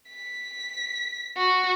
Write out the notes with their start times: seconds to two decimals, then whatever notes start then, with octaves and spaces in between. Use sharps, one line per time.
0.10 B6
1.37 F#4